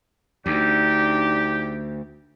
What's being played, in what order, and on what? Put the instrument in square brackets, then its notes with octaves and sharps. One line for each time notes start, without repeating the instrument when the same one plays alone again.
[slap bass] D2 [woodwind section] D4 D#4 G4